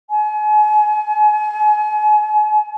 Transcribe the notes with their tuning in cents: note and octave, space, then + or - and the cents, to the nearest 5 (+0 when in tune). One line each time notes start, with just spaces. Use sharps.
G#5 +35